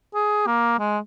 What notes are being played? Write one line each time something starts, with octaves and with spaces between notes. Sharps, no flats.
G#4
A#3
G#3